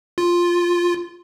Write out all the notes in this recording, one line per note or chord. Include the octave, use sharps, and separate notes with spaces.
F4